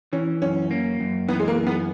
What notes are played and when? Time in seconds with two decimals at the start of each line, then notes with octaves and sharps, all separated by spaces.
0.13 E3 C#4
0.42 F#2 C#4
0.71 A#3
1.00 F#2
1.29 E3 B3
1.40 G#3
1.48 A#3
1.58 F#2
1.67 B3